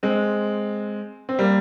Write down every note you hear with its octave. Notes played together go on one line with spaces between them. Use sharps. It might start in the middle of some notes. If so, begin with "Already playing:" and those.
G#3 C4
C4
G3 A#3